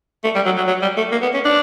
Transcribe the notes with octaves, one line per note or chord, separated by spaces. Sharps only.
A3
G3
F#3
F#3
F#3
G3
A3
A#3
B3
C#4
D4